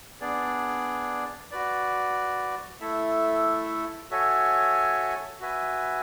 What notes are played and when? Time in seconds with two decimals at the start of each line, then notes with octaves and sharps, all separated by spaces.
0.20 B3 D4 G#4 D5
1.51 F#4 B4 D5
2.81 A3 E4 A4 E5
4.11 F#4 A4 C#5 E5 G#5
5.40 F#4 B4 E5 G#5